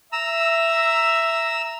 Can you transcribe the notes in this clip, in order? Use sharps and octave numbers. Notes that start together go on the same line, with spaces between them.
E5 A#5 E6